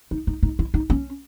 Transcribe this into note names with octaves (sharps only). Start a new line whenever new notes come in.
D#4
D#4
D#4
E4
D#4
C#4